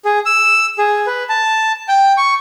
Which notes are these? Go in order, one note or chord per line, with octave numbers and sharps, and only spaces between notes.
G#4
E6
G#4
B4
A5
G5
C#6